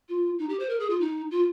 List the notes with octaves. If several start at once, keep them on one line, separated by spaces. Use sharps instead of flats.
F4
D#4
G4
C5
A#4
G#4
F4
D#4
F4